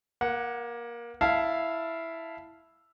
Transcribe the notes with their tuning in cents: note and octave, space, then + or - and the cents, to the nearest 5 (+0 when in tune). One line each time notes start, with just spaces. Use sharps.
A#3 +20 F#5 -10
E4 +0 F5 -10 A5 +0